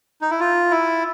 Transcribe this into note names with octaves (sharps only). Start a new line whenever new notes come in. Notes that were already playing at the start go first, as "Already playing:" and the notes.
D#4
E4
F4
E4